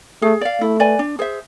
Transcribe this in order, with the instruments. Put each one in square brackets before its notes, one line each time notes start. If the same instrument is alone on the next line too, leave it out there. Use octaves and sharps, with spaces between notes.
[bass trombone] A3 [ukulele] G#4
[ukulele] D5 F5
[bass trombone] A3 [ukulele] E4
[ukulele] B4 D5 G#5
D4
G#4 C5 E5